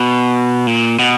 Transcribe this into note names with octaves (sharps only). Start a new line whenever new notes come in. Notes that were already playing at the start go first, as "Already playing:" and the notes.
Already playing: B2
A#2
B2